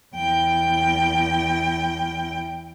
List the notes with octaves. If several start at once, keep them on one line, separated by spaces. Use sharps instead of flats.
E2 G5